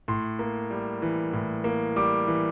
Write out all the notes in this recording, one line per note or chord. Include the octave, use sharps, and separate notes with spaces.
A2 C6
A#3
G3
E3
A2
A#3
G3 D6
E3